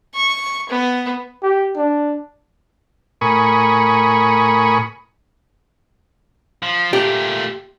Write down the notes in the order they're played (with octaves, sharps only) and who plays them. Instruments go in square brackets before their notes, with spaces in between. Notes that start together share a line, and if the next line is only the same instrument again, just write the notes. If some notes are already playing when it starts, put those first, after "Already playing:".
[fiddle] C#6
B3
[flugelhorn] G4
D4
[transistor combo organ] A2 A#4 G#5 B5 C#6 D#6
[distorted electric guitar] F3
[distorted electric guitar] A#2 A3 [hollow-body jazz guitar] G4